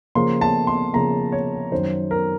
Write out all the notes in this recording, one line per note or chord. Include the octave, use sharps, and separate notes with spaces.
C#3 F3 A#3 C6
A5
C6
C#3 F3 A#3 A#5
C#5
F#2 D#3 F#3 C5
A#4